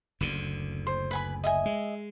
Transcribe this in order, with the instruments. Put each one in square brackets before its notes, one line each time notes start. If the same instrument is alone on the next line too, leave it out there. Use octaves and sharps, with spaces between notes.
[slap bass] F#1 D2 D3
[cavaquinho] C5
B4 G#5 B5
D#5 E5 G#5
[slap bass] G#3